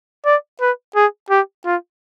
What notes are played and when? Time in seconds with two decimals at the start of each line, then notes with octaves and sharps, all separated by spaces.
0.26 D5
0.61 B4
0.96 G#4
1.30 G4
1.66 F4